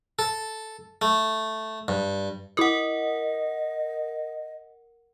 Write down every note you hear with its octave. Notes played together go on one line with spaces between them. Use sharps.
A4
A3
G2
E4 A#4 D#5 F#5 D6 D#6